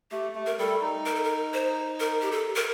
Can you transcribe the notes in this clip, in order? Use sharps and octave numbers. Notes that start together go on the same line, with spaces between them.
A3 G4
A3
A#4
G3 A4
D#4
A#4
A4
A#4
C5
A#4
G4
A4
A#4